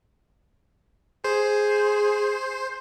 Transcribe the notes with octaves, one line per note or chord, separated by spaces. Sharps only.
G#4 C5